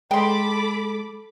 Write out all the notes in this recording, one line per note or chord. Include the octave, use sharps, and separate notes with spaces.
G#3 A4 G5 B5 C6 D6